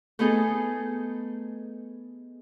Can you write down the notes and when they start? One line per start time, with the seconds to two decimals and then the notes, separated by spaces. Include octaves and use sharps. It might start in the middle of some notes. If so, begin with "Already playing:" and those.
0.19 A3 B3 D#4 G#4 A4